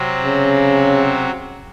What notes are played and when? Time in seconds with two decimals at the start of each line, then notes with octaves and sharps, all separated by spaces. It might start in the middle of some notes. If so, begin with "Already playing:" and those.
Already playing: C3 F#3 C4 F#4
0.25 C#3